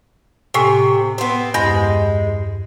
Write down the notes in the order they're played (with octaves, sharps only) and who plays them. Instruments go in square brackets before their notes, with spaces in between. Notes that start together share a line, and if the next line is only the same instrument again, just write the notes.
[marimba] A2 G#5 [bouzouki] C3
[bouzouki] B3 C4
[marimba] E2 G2 [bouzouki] G#3